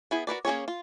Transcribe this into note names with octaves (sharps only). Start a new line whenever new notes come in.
B3 E4 G#4
F#4 A#4 B4 D5
A#3 C#4 G#4 C#5
F4